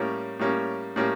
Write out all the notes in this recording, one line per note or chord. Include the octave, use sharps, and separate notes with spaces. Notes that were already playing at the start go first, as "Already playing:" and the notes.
Already playing: A2 G3 A#3 C#4
A2 G3 A#3 C#4
A2 G3 A#3 C#4